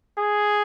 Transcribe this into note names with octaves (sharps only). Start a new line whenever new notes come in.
G#4